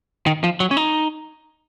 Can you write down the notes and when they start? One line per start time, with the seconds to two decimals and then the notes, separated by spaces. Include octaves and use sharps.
0.26 D#3
0.44 F3
0.60 F#3
0.71 C#4
0.77 D#4